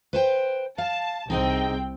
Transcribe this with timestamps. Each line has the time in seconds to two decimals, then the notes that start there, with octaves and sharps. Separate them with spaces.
0.13 B4 C5 G5
0.78 F5 A5
1.30 C2 C4 D#4 G#4 D#5 G5